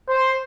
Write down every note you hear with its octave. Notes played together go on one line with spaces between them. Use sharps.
C5